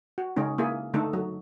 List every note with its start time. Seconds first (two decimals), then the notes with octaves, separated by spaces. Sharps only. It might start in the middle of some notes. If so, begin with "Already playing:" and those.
0.18 F#4
0.36 C#3 G#3 C#4 D#4
0.58 A#3 E4 G#4
0.94 D3 A3 D#4 A4
1.13 F#3